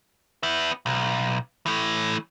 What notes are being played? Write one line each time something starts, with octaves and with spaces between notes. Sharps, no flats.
B3 E5
B1
E3 A3